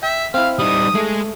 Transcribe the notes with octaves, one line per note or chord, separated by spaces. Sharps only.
E5 G5
C4 E4 F5
G3 D#4 D#6
G#3 A3 G#4